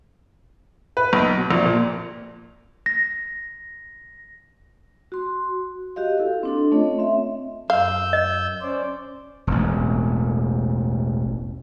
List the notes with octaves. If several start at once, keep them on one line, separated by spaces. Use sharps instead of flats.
B4
B1
B2
A#1
A#2
A#6
F#4 C6
F#4 G4 D#5 F5
E4 A4 F5
C4 D4 A4
A3 C#4 F4 C#5 D#5
C4 E5
F#2 F5 E6 G6
D#5
C#4 C5 D5
E1 A1